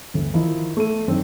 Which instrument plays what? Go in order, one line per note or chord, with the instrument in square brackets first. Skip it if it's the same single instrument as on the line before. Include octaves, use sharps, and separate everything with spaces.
[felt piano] G1 D2
D#3 F3 D#4 E4
A3 D#7
F#2 D#3 C4 D4